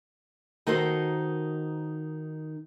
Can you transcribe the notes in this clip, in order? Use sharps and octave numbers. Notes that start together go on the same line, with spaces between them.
D#3 D#4 F#4 A4 A#4 C5